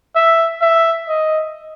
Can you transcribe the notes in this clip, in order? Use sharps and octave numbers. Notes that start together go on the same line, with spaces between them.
E5
E5
D#5